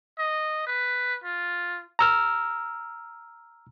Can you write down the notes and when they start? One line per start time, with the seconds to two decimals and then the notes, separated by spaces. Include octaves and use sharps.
0.19 D#5
0.67 B4
1.24 F4
1.99 A#5 E6 F6